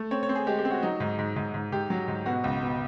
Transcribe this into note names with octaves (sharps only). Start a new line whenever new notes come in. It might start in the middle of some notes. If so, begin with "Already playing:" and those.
Already playing: A3
C4 C#5
C#5
C4
G#4
G#3 G4
G4
C4
F#4
F#3 D#4
G#2
G#2
G#2
G#2
G#2 G4
F#3
G#2
B2 F#4
C#2
B2